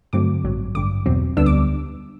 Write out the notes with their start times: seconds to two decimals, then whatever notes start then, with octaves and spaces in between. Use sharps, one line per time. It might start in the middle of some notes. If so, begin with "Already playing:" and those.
0.13 G2 D3 F#3 A3 C4 D6
0.44 A1 G2 F#3
0.75 A1 G2 D3 D6
1.06 E2 B2 F#3 C4
1.37 D2 D3 G3 B3 D4 E6
1.46 D6